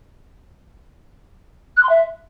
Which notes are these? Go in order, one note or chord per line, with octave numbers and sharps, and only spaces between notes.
F#6
C6
E5